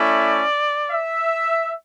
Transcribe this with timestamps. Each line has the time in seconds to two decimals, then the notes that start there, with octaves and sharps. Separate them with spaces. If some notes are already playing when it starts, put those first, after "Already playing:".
Already playing: A3 C#4 E4 D5
0.91 E5